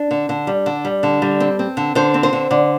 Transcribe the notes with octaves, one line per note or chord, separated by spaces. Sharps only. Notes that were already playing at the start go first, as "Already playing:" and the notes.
Already playing: D4
D3
D3
G3
D3
G3
D3
G3
C4
C4
D3
D3 C5
C4
C5
D3
D3